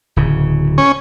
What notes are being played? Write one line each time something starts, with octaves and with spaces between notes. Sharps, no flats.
D1 C#3
C#4